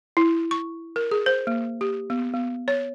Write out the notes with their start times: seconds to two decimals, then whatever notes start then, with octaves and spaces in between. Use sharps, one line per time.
0.17 E4
0.51 C#6
0.96 A#4
1.11 G#4
1.26 C5
1.47 A#3
1.81 G4
2.10 B3
2.34 B3
2.68 C#5